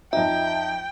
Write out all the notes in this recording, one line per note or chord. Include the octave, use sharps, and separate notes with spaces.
F2 D#4 E5 G5